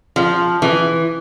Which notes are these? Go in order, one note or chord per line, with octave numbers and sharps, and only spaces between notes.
F3
E3